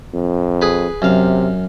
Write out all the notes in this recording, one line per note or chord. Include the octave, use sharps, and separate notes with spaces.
F2
G#4 B4
F#2 C3 F5